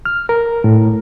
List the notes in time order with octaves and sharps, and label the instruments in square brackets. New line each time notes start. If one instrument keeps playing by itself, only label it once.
[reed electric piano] F6
A#4
A2